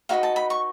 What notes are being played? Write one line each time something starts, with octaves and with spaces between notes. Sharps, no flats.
D#4 F#4 B4 D#5 F5
A5
B5
C#6